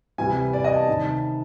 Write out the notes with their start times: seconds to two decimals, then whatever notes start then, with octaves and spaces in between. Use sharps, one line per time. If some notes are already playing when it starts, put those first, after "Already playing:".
0.18 C2 C3 E3 G3 G#5
0.53 D5
0.64 D#5
0.76 A5
0.88 C2 C3 D#3